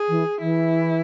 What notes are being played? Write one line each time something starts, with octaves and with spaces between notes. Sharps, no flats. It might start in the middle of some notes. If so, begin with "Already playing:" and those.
Already playing: G#4
E3
E3 E4